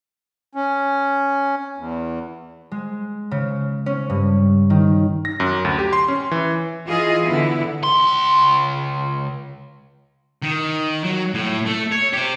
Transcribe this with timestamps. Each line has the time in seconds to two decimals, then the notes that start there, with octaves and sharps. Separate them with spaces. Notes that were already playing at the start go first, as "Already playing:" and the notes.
0.55 C#4
1.78 E2
2.72 G#3
3.31 C#3
3.86 C#4
4.10 G2
4.70 D#3
5.25 A#6
5.40 F#2
5.65 D2
5.79 G4
5.93 C6
6.08 C#4
6.31 E3
6.87 E3 F4 G#4 D#5
7.25 D3 B3 E4
7.83 C#2 C6
10.42 D#3
11.04 F#3
11.34 A2
11.66 A3
11.92 C#5
12.13 G4 C5